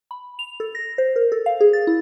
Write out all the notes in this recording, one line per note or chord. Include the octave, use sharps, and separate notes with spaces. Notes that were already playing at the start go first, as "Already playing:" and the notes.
B5
F7
A4
A#6
C5
A#4
A4
F5
G#4
A6
E4